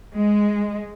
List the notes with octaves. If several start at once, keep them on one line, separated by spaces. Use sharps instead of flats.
G#3